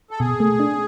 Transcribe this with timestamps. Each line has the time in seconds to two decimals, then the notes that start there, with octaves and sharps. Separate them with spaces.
0.11 A4
0.20 B2 G#4
0.40 A3
0.60 D4